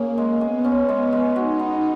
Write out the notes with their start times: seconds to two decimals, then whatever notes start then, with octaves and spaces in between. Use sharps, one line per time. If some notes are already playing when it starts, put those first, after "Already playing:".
Already playing: A#3 C#4 G#4
0.18 G#3
0.41 B3 G#4
0.64 C#4
0.88 G#3
1.12 G#3
1.36 D#4 F#4
1.59 B3